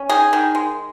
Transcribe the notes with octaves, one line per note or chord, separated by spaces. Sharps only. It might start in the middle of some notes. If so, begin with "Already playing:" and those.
Already playing: C#4
D#3 G#4
D#3
G#3